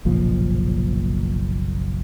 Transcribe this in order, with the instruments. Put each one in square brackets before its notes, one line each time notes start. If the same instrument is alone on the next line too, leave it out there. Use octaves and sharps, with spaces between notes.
[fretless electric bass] F#1 B1 A#2 F3